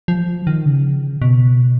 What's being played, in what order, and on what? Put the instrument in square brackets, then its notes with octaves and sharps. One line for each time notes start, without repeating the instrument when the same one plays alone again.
[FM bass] F3
D#3
C#3
B2